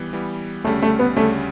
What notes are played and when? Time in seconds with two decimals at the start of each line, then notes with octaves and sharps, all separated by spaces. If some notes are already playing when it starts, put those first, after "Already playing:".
Already playing: E3 G3 B3
0.13 E3 G3 B3
0.64 D2 C#3 G3 A3 C#4
0.82 A3
0.99 B3
1.16 D2 C#3 G3 A3 C#4